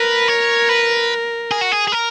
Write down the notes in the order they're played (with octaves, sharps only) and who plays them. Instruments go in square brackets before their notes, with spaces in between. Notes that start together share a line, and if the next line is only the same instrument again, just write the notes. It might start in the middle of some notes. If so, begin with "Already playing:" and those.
Already playing: [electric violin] A#4 [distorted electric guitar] B4
[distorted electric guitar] C#5
B4
G#4
F#4
G#4
G#4
A#4